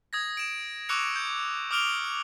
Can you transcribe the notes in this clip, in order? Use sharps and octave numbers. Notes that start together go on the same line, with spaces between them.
D#6 G#6 A#6
D7 E7
C#6 D6 E6 F#6 C#7 F7
G6
D6 D#6 F6 D7 F7 G7